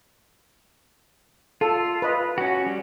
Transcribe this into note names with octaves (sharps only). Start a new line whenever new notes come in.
F4 A4
B4 D#5
C#4 F#4
G3